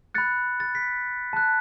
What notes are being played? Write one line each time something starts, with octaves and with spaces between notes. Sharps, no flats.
B5 F#6 A6 C#7
A6
B6
A5 F#6